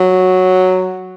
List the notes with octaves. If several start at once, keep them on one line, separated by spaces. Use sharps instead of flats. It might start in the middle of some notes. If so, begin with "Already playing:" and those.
Already playing: F#3